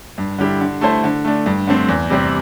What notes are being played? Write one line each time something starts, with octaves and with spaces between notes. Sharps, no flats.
G2
D3 G3 E4 G4
D3
A3 E4 A4 C5
D3
A3 D4
G2
D3 A3 C4
E2
C3 G3 C4